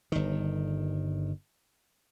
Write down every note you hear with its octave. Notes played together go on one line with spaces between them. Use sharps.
G1 D#3